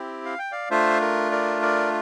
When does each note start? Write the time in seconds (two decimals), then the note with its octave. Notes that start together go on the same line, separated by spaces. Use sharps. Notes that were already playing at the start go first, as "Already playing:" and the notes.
Already playing: C4 E4 G4
0.25 F5
0.39 G5
0.52 D5 F5
0.71 A3 D4 F4 C5 E5
1.01 A#4
1.32 A#4 D5
1.62 A#4 D5